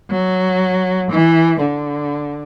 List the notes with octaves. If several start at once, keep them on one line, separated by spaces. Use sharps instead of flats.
F#3
E3
D3